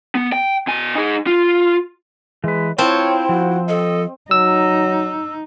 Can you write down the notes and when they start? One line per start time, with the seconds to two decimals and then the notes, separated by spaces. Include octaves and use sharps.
0.15 B3
0.33 G5
0.67 B2 G#5
0.95 D#4 G#4
1.26 F4
2.44 E3 G#3 B4
2.78 C4 E4 F4 C#5 A5
3.29 F3 F#4
3.69 A4 D#5
4.31 F#3 D#4 E6